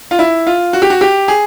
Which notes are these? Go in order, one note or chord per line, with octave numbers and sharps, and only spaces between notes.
F4
E4
F4
F#4
G4
F#4
G4
G#4